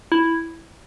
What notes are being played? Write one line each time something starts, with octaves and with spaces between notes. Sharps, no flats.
E4